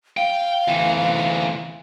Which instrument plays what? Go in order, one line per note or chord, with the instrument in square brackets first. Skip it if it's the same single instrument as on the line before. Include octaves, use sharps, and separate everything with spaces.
[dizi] F5 [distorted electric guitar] G5
[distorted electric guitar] D2 E3